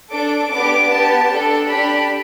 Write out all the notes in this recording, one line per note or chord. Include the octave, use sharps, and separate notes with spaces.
D4 A4 D6
B3 D4 G4 D6
B3 G4 A5
D4 A4
D4 G4 B5